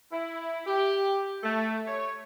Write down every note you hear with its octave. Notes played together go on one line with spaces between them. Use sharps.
E4
G4
A3
C#5